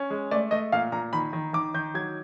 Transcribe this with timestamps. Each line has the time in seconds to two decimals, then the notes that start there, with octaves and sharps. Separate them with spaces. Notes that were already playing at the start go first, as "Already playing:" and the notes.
Already playing: C#4
0.10 G#3
0.31 A3 D5
0.51 A3 D#5
0.72 A#2 F5
0.92 A#2 A#5
1.13 D#3 B5
1.33 D#3
1.53 D#3 D6
1.74 D#3 G6
1.94 F#3 G#6